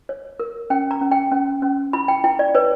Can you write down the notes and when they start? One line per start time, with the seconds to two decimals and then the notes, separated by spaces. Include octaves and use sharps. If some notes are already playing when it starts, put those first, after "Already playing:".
0.09 C#5
0.40 A#4
0.70 C#4 G5
0.91 A#5
1.01 C#4
1.11 G5
1.32 C#4
1.62 C#4
1.93 E4 B5
2.08 G5
2.24 E4 G5
2.39 D5
2.55 B4 C#5